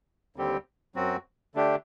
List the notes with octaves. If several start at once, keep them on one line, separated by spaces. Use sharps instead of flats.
D#2 D3 G3 C4 G4
F#2 F#3 C4 F#4
D3 A3 D4 G4